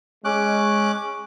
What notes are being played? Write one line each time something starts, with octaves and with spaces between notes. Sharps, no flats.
G#3 C#4 D6 F#6